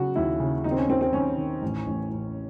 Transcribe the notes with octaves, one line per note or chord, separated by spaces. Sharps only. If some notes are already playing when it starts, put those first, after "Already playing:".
Already playing: C#3 F#3 F#4
D#2 E4
C#3
D#2 D#4
C4
C#4
D#2 C4
C4
D#2 C#4
D#3
A1
A1
A1